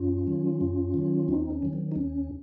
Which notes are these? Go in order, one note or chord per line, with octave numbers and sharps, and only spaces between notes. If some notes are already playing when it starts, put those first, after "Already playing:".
Already playing: F#2 C#4 F4
D#3 F#3
F#2
D#3 F#3
D#2 C4 D#4
C#4
D#3 F#3
C4
D#4
D#2 C#4